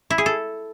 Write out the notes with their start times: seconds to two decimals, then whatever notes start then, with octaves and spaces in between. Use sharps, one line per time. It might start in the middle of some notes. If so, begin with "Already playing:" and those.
0.10 E4
0.18 G#4
0.26 A4